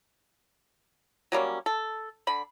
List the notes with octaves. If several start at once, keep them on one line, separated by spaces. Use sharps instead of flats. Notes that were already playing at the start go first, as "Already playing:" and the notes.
F#3 G3 A#3 C#4
A4
D3 B5